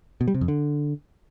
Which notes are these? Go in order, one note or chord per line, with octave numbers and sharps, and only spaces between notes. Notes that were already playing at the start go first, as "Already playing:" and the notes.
B2
G3
C3
F2
D3